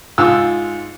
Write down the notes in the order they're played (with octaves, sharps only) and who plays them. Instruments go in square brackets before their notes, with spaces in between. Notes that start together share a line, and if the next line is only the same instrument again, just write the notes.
[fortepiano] G#2 F4 E6